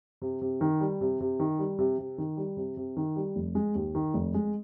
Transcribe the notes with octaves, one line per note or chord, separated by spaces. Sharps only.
C3
C3
D#3
G3
C3
C3
D#3
G3
C3
C3
D#3
G3
C3
C3
D#3
G3
F1
G#3
D#2
D#3
F1
G#3